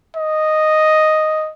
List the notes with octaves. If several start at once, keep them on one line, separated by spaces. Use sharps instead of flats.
D#5